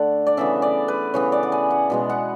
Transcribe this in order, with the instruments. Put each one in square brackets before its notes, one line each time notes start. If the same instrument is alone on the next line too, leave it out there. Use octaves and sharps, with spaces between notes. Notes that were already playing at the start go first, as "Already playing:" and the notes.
Already playing: [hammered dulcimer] D3 A3 A4 D5 F#5
D5
C#3 E3 B3 E5
D5
B4
C#3 E3 B3 C#5
D5
F#5
G#5
F#5
B2 G#3 B3
F#5